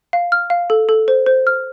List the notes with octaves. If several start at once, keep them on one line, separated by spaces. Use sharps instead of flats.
F5
F6
F5
A4
A4
C5
C5
F6